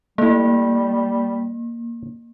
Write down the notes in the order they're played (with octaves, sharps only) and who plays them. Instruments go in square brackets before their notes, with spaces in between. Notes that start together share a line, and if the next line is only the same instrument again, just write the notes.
[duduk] G3 [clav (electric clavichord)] A3 E4 [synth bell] A#3